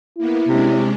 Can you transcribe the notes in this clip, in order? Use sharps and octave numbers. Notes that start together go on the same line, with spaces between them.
A#3 B3 E4
C3 G#3 C#4 D4